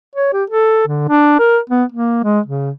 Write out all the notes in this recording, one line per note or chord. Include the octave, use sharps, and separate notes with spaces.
C#5
G4
A4
D3
D4
A#4
B3
A#3
G#3
C#3